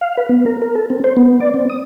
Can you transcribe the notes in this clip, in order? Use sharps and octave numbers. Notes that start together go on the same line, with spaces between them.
F5
B4
B3
A#4
A#4
A4
C4
C5
B3
D5
C4
D#6